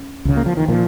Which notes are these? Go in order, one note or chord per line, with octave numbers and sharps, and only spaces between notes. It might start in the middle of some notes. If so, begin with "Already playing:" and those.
Already playing: C#4
C#2 C#3
A#3
F3
D#3
A#2 F3